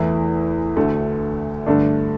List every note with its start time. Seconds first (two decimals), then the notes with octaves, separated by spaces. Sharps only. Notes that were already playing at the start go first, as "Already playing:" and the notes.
Already playing: E2 E3 A3 E4
0.77 D2 D3 A3
1.66 G2 D3 A3 D4